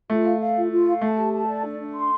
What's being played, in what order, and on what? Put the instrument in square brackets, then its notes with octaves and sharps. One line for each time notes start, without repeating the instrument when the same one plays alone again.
[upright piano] A3 [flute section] F4
[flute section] F5
F5
F4
F4
F5
[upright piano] A3 [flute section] A5
[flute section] G4
A5
D5
D4
D4
C6